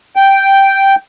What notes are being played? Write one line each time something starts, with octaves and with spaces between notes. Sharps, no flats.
G5